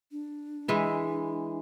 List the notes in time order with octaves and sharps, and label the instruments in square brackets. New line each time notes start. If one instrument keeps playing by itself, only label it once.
[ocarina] D4
[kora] E3 G#3 E4